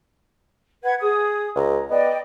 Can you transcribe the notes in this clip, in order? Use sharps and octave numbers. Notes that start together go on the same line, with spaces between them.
B4 F#5 G#6
G#4 D#6
C#2 A#5
B3 D5 D#5 G5